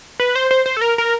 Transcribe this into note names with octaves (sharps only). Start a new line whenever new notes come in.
B4
C5
C5
C5
A4
A#4
A#4